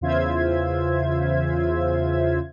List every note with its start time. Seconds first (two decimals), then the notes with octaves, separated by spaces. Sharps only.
0.01 E2 C#3 F4 C5 E5 G#6